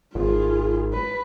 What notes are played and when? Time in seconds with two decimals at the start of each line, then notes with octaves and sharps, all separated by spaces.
0.15 G#1 F4 G#4
0.93 B4